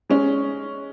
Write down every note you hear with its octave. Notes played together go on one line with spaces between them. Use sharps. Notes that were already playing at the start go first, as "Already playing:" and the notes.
G#3 C#4